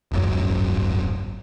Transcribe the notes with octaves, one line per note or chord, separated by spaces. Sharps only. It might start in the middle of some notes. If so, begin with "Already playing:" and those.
D1 G#1 F#2 F#3